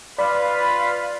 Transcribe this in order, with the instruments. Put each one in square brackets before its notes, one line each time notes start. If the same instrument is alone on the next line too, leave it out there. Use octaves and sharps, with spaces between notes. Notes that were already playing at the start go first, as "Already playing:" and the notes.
[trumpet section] F4 B4 F5 [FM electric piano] D5 B5